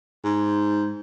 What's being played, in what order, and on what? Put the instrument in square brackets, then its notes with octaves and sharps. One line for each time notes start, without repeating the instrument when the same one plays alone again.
[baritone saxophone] G#2